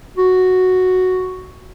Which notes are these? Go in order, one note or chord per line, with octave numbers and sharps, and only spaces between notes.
F#4